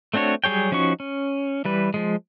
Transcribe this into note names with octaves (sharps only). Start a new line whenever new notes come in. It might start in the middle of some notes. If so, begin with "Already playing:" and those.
A3 C4 D4 F#4 C#5
F#3 G3 G#4 C#5 G5
F3 C#4 D#4 F#4 C#6
C#4
E3 G3 B4
F3 G#3